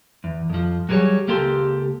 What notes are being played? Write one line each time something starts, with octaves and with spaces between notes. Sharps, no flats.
E2
F2 F3
F#3 G3 G#4 A#4 C#5
C#2 A#3 G4 A4 C6